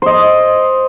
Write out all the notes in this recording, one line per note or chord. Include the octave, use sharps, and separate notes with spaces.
C5 D#5